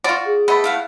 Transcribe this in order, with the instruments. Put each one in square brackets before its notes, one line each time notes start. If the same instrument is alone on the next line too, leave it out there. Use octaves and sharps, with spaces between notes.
[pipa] F4 D5 [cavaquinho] F#4
[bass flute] G#4
[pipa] A3 B3 [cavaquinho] D#5
[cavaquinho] E4 F5 F#5